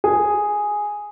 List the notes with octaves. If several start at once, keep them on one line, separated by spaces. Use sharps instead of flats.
G#4